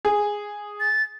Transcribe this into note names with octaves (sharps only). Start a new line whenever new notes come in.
G#4
A6